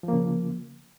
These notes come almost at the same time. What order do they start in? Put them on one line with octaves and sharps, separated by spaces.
F3 A#3 C#3